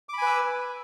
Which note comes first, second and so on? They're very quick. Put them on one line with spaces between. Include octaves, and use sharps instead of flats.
D6 B5 G#5 B4 E6